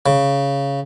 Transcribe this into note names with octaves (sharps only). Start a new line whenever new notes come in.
C#3